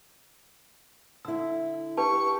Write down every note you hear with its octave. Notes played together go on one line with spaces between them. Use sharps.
D3 E4 E6
D4 G4 B4 A5 C#6